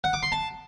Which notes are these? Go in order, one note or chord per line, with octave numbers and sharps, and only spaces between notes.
F#5
D6
C6
A5